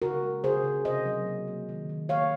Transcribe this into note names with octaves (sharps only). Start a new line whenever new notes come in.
C#3 F#4 A#4
G#3
C#3 G#4 C5
C#3
C3 C5 D#5
F#3
A#3
A#3
D#3
D#3
A#3 C#5 F5